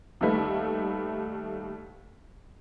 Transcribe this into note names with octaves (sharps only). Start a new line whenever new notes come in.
D#2 G3 A3 B4